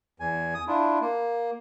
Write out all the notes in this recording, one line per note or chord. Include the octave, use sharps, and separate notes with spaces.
E2 G#5
D#6
D4 E4 F4
A#3